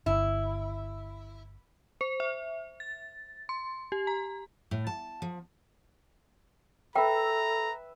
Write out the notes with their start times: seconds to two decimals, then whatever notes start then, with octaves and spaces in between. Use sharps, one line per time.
0.06 G1 E4
2.01 C5
2.20 E5
2.80 A6
3.49 C6
3.92 G4
4.07 A#5
4.71 A2
4.87 A5
5.22 F3
6.96 A4 B4 E5 G5 A#5